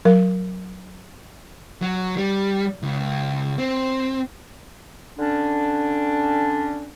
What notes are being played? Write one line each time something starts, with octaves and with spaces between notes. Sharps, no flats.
F#3 A#4
F#3
G3
C#2
C4
D3 C#4 D4